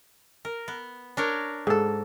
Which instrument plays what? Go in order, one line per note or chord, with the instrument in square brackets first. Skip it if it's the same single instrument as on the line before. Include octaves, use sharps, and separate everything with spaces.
[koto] A#4
B3
D4 A#4 C#5
[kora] G#2 A4